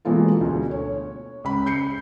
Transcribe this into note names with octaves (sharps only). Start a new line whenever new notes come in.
B2 E3 G#3 A#3 F4 A4
D2 B2
C#5
C#2 B5
G6 C7 C#7